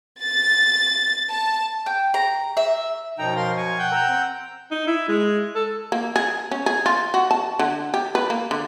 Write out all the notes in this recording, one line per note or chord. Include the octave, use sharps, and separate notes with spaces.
A6
A5
G5
A#5
E5
F#2 B2 F3 D#4 G5 A#5
A#4 F5 C6
G#5 C#6
F#5 G5 G6
A#5 E6
C4
D#4
E4
G#3
A4
A#3
G#4
C#4
G#4
F4
F#4
A5
D3
G4
B4
A#3
D3